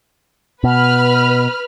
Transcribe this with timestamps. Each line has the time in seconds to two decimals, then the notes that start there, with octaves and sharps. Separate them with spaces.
0.64 B2 B4 B5 F6